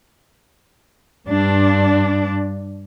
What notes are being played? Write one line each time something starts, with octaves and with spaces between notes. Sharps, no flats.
G2 D4